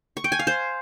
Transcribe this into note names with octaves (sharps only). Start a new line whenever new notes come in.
C#6
G5
G#5
F5
C5